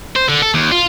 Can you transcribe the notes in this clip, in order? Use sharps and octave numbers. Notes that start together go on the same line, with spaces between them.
C5
D3
A4
D#2
F4